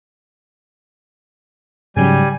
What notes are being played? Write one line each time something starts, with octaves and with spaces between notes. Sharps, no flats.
G#2 C#3 F#3 G3 G#5